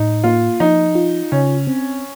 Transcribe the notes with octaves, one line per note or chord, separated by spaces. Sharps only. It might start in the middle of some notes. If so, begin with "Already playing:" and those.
Already playing: A2 D#4
A#3 F4
F3 D#4
F4
C#3 C#4
C4